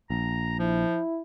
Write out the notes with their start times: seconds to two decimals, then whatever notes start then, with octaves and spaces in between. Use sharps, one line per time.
0.10 A#1 A#5
0.59 F3 E4